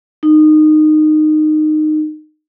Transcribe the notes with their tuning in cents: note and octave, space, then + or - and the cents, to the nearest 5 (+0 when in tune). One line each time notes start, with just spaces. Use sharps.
D#4 -20